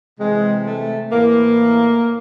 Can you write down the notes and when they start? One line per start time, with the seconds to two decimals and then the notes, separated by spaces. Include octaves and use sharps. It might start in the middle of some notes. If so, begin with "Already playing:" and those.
0.20 C3 E3 G#3
0.66 A3
1.12 A2 E3 A#3